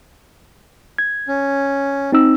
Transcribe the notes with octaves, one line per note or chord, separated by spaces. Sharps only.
G#6
C#4
C4 D#4 E6